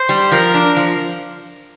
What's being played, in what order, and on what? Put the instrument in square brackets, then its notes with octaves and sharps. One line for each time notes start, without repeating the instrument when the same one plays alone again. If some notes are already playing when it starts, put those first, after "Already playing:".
Already playing: [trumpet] C5
[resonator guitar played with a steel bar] G3
[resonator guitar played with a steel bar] F3 [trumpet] A#4
[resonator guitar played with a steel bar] D4
F3